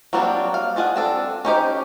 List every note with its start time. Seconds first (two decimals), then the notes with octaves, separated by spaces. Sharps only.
0.13 F#3 G3 A#3 C4 D4
0.54 F5
0.76 D4 F4 G#4 F#5
0.96 C4 D4 A4
1.45 C#4 D#4 G4 C5